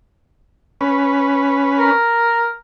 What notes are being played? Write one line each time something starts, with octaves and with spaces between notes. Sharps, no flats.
C#4 B4
A#4